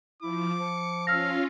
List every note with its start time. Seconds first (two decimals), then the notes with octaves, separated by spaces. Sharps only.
0.22 F3 E4 D6
0.58 F3 C#7
1.07 C#4 F4 F5 E6 F6 A#6